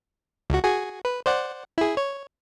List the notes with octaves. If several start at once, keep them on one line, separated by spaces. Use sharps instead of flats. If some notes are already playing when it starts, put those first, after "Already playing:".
C#2 F#4
F#4 G#4 G#5
B4
C5 D5 F#5
E4 G#4
C#5